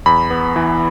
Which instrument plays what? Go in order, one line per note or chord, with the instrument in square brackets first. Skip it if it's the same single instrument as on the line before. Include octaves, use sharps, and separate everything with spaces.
[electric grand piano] E2 B5
B3
E3